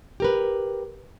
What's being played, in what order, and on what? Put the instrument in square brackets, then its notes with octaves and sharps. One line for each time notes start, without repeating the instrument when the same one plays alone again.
[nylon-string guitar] G4 A#4 B4